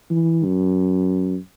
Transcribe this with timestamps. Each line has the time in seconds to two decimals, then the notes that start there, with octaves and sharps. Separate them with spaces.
0.10 E3
0.44 F#2